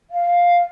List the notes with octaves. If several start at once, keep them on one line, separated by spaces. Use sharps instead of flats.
F5